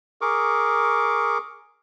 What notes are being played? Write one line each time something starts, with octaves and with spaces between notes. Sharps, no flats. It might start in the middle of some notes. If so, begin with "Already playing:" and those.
G#4 A#4 C#6 D6